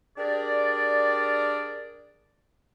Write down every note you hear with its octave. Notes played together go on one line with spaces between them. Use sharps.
D4 G4 G#4 A#4 D5